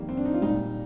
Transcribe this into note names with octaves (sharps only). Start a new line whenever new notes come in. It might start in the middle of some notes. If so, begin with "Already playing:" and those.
Already playing: F2 D#3 G3 A#3
C4
D4
D#4
F4
A#2 G3 D#4